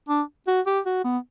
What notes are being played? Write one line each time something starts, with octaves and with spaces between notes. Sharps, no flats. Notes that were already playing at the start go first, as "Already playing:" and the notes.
D4
F#4
G4
F#4
B3